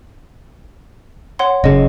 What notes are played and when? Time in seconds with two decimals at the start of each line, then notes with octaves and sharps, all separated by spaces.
1.39 C#5 F#5 C6
1.64 F#1 C#3 D#5